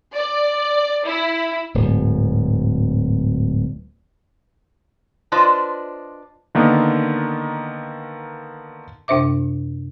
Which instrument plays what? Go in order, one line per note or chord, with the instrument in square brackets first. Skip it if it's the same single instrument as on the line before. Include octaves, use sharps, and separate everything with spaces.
[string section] D5
E4
[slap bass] D1 G#2
[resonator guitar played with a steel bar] D4 F4 B4 C5 D5 D#5
[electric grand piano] D3 D#3 A#3 B3 D#4
[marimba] F#2 C3 D4 C5 E5 D6